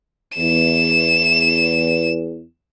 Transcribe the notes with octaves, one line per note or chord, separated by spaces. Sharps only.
E2 E7